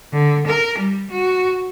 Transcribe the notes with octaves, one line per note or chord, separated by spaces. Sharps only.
D3
A#4
G3
F#4